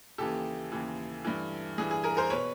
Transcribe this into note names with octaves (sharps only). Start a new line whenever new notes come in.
D#2 C#3 E3 G4 A4
D#2 C#3 E3
G2 E3
G2 E3 G#4
G#4
G#4 A#4
A#4 C5
B2 B4 C#5